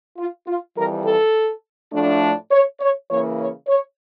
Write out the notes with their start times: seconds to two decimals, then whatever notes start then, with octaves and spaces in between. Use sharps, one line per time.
0.18 F4
0.47 F4
0.75 F2 E3 G3 A#4
1.05 A4
1.92 A2 F3 A3 D4
2.51 C#5
2.80 C#5
3.09 C#3 E3 A#3 C#5
3.38 C#5
3.67 C#5